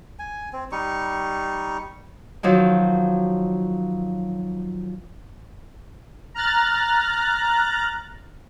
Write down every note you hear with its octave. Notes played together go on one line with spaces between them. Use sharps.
G#5
C4
G3 D#4 C#6
D#3 F3 F#3
A#5 F6 F#6 A6